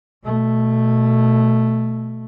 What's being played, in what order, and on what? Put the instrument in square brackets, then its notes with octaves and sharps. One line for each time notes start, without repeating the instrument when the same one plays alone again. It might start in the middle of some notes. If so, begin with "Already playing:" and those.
[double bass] B2 A3